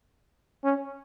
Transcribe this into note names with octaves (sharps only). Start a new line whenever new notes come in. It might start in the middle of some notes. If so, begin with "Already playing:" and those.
C#4